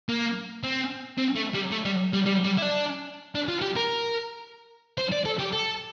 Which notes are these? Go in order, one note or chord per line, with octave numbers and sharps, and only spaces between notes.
A#3
C4
C4
A3
G3
A3
G3
G3
G3
G3
E4
D4
D4
F4
G4
A#4
C5
D5
A4
G4
A4